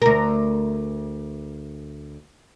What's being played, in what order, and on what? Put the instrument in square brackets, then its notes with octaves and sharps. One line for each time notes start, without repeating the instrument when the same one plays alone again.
[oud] D2 A#4